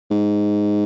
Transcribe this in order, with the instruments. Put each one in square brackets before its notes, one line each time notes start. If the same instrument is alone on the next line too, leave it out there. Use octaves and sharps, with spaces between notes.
[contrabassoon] G#2